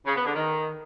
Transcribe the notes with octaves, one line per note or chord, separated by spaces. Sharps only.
C#3
B3
D3
D#3